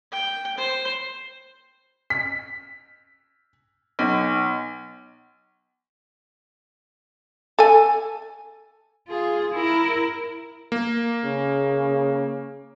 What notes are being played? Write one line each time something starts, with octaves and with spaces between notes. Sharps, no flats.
G5
C5
B6
B1
A4 G#5
F4 G#4
E4 A#4
A#3
C#3